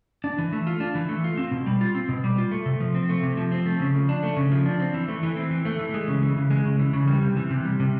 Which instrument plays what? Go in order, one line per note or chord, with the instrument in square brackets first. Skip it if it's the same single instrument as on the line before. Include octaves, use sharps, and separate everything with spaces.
[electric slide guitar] D4
E3
A3
F4
D4
E3
A3
F4
C4
B2
G3
F4
C4
B2
G3
F4
A3
C3
F3
C4
A3
C3
F3
C4
A3
C#3
F3
D4
A3
C#3
F3
D4
C4
E3
A3
E3
C4
E3
A3
E3
G#3
C#3
E3
C#3
G#3
C#3
E3
C#3
G3
C3
E3
C3
G3
C3